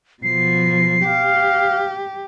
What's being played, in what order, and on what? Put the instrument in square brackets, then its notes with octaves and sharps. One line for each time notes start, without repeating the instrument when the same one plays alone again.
[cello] B2 F3 [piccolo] C7
[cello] G4 [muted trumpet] F5